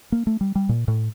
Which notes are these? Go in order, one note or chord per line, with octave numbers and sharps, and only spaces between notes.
A#3
A3
G3
G3
A#2
A2